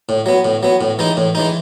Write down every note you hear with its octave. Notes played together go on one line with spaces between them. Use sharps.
A2
F#3 B3
A2
F#3 B3
A2
E3 G#3 D#4
A2
E3 G#3 D#4